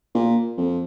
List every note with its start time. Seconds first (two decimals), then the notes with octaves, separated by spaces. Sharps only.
0.15 A#2
0.57 F2